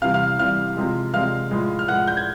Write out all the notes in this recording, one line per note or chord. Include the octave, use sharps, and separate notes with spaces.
C3 E3 G3 F5 F6
F5 F6
C3 E3 G3 F5 F6
C3 F3 G#3
C3 F3 G#3 F5 F6
A2 F3 G#3
F6
A2 F3 G#3 F#5 F#6
G6
G#6